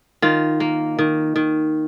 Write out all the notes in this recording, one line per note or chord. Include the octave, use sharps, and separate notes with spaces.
D#3 F4
A#3
D#3
D#3